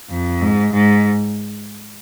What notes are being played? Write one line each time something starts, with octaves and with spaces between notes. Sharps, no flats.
F2
G#2
G#2